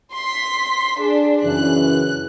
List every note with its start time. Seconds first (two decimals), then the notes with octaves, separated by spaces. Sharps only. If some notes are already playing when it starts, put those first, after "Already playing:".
0.13 C6 B6
1.00 D4 G#4
1.43 F#2 C#3 E3 F#6